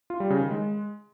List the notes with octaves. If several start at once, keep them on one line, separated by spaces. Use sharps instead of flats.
F4
G3
C#3
D#3
G#3